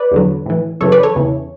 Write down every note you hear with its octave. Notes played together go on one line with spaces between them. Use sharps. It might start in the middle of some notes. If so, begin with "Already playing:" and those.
Already playing: B4 D5
E2 D3 F#3
A2 E3
F#2 C#3 E3 A4 C#5
B4 D5
A4 C#5
E2 C#3 E3